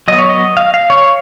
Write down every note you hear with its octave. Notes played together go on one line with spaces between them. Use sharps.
F#3 B3 D#5
C#5
D#5
F5
F5
C#5